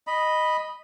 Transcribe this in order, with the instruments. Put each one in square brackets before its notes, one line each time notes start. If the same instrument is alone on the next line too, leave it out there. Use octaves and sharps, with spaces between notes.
[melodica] D#5 B5